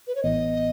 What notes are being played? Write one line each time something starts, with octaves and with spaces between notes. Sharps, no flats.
B4
C#5
A1 A2 E3 B3 D#5